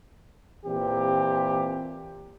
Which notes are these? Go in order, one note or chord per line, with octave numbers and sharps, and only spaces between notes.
A#2 E3 C4 G4